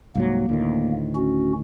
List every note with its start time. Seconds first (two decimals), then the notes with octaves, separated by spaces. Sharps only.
0.15 C2 G#2 F#3 A#3
0.49 D2 A2 D#3
1.15 C#4 F#4